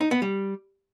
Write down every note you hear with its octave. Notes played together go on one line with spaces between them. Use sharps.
D#4
B3
G3